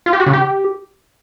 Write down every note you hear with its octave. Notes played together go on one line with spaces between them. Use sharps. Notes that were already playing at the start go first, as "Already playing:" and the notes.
F4
G4
F#4
C#3
G4